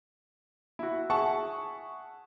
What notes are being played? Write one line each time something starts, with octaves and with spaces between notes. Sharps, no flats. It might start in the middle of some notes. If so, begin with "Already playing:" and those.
E4 F#4
G#4 E5 F#5 A5 C#6